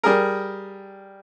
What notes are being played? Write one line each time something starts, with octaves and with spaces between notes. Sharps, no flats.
G3 G#4 A#4